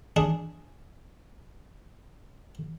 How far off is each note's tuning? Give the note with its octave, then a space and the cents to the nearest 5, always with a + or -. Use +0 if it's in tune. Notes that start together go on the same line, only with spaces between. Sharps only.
D4 +0 G#4 +0